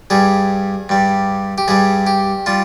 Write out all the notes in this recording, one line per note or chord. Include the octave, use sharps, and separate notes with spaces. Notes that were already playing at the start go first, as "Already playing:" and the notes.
G2 G3 G#4
G2 G3
G4
G2 G3 G#4
G4
G3 F4